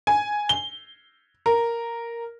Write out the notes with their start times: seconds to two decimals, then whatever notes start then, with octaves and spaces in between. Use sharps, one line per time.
0.07 G#5
0.49 G7
1.46 A#4